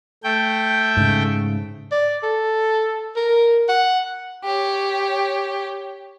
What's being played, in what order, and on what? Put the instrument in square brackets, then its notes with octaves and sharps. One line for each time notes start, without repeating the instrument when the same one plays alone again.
[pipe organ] A3 G5
[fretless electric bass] G#2 C#3
[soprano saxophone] D5
A4
A#4
F#5
[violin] G4 C#5